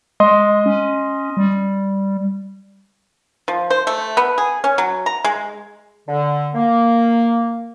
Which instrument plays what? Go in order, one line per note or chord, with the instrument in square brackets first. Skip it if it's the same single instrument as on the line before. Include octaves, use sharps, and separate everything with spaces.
[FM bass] G#3 [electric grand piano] D#5 C6
[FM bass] C#4
G3
[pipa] F3
C5
A3
B3
G#4
C#4
F#3
A#5
G#3
[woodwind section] D3
A#3